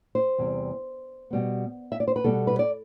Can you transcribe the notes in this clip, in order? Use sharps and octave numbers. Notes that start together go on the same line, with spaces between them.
C5
E2 C3 G3
B2 G3 B3
E5
D5
C5
B4
B2 G3 B3 A4
B4
D5